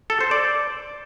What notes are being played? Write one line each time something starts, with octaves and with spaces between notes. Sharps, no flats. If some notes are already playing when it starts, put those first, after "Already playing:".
A4
C5
D5